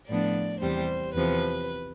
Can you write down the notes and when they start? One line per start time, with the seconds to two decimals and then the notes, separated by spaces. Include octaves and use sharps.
0.09 A2 F3 B3 D4 D5
0.62 E2 C3 G3 C5
1.15 E2 C3 F3 B4